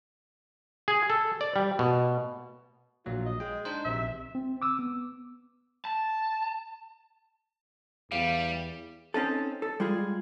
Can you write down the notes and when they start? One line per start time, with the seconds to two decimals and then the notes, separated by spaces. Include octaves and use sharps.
0.88 G#4
1.10 A4
1.41 D5
1.56 G3
1.79 B2
3.06 A#1 A#2 F#3 F4
3.26 D#5
3.40 G#3 G5
3.65 D4 D#4 C5
3.85 A#1 C3 E5
4.35 C4
4.62 D6 E6
4.79 B3
5.85 A5
8.12 E2 G3 F5
9.14 C4 C#4 D#4 A4
9.62 A4
9.80 G3 G#3 F4 G#4